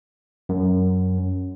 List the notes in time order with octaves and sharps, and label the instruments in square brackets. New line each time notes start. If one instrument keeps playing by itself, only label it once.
[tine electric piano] F#2